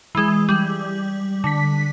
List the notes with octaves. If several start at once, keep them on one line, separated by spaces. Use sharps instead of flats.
E3 G#3
G3
D3 B6